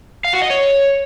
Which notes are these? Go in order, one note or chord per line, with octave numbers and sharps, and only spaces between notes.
F5
F#4
D#5
C#5